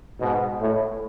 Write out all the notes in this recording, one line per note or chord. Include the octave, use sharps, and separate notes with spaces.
G#2 B2
A2